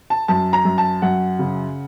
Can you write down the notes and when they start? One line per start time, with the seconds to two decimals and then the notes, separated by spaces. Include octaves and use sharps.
0.10 A5
0.28 F#2 A5
0.53 A#5
0.65 F#2
0.78 A5
1.02 F#2 F#5
1.39 C#3